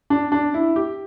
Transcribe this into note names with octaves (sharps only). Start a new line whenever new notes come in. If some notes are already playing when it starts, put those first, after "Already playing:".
D4
D4
E4
G4